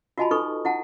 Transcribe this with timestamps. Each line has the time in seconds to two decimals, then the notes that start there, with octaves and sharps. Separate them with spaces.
0.18 F4 F#4 D#5 G#5 A5 B5
0.31 D#4 A4 B4 C#6 D#6
0.65 E4 F#5 A5